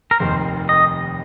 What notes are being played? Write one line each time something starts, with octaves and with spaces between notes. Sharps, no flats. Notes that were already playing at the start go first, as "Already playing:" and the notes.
A#4
F1 D#2 D#3 C5
D#5